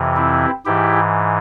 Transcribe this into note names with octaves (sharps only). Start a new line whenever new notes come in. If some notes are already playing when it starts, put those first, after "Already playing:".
Already playing: F2 C3 E3
C4 E4
G#2 E3 E4 G4